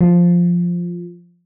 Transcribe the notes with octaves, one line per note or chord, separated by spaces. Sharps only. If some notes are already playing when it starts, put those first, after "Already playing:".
F3